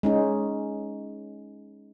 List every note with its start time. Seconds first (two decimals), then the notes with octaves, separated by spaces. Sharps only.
0.03 G#3 C#4 D#4